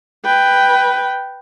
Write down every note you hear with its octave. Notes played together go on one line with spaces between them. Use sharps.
B4 G5